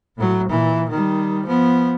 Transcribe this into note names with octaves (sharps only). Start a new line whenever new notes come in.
A2 F#3
A#2 E3
D#3 G3
F3 B3